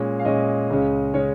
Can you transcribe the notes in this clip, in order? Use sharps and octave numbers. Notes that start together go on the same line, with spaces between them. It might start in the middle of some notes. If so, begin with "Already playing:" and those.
Already playing: A#2 G#3 C#4
F5
A#2 G#3 C#4 D#5
C#2 C#3 G#3 C#4
C#3 G#3 C#4 C#5